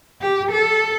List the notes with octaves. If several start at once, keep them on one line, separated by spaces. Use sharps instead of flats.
G4
A4